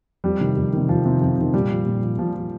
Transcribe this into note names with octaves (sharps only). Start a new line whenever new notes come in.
F2 G3
C3 D#3
F2
C3 D#3
F2 F3
C3 D#3
F2
C3 D#3
A#2 G3
F3
A#2
F3
A#2 F3
F3